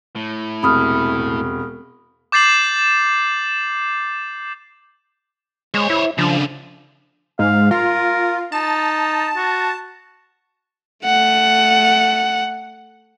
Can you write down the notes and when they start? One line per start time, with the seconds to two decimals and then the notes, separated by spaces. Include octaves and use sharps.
0.16 A2
0.63 E1 C3 B5 D#6 F6
2.32 D6 G6 A6 C7 E7 F#7
5.74 G#3 C5 C#5
5.90 E4
6.18 C#3 F3 D4
7.39 G#2 F5
7.71 F4 A#4
8.52 D#4 A5
9.37 F#4
11.05 A3 F#5